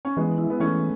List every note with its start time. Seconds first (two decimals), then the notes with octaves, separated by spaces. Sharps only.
0.05 C#4
0.17 E3 G#3 B3
0.38 E4
0.50 B3
0.60 E3 A3 C#4